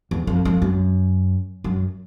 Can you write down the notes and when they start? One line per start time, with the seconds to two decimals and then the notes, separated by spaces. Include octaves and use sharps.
0.11 E2
0.27 F2
0.45 F2
0.62 F#2
1.64 F#2